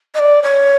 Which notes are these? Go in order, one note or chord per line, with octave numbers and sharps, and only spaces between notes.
D#5
D5
C#5